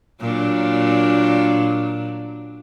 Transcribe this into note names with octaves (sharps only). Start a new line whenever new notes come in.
A#2 F#3 D4